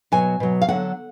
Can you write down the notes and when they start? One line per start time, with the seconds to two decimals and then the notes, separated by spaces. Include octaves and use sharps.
0.12 B2 F#3 G#5
0.40 B2 F#3
0.62 F5
0.68 D3 F#3 F#5